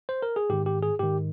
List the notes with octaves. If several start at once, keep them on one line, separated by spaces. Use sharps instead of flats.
C5
A#4
G#4
G#2 D#3 G4
G4
G#4
G#2 D#3 G4